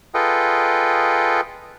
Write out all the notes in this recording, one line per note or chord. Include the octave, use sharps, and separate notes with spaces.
F4 G#4 A4 B4 D#5 G5